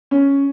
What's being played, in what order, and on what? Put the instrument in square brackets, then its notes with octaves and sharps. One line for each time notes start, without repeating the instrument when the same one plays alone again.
[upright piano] C#4